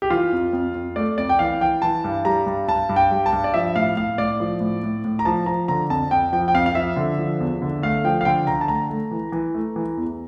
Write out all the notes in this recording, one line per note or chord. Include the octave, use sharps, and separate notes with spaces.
G4
E3 F4
F2
F2
F2
A3 D5
F2 D5
G5
E3 F5
E3 G5
E3 A5
G2
G3 A#5
G2
G2 A5
G2
G5
G3
A5
G2
D5
F3 E5
A2 F5
A2 F5
A2 D5
F3
A2
A2
A2
A#5
F3 A5
F3 A#5
D3 A#5
F2 A5
F2 G5
F3 G5
G5
F2 F5
F5
F3 E5
D3
F3
E2
D3
A3 F5
F3 G5
F5
D3 G5
D3 A#5
A5
A3 A#5
A3
E3
E3
A3
E3
E2